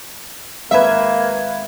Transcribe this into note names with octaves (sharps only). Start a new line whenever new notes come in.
G#1 A#3 B4 E5 F5 G#6